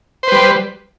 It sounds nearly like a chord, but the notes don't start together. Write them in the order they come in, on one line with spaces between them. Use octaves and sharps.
C5 B4 G3